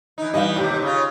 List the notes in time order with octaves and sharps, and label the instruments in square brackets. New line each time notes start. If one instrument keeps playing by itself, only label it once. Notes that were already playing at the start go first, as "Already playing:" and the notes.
[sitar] E3 D#4
[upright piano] G2 E3 F5 [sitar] G3 B3 D#5
[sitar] D#2 A2 C3 [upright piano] G4
[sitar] C#3 F4